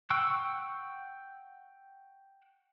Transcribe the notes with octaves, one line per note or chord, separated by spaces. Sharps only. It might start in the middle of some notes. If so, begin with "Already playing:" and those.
F#5 G5 C#6 E6 F#6